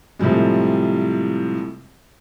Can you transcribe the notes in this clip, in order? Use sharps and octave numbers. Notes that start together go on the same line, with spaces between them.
A2 C3 F3 G3 G#3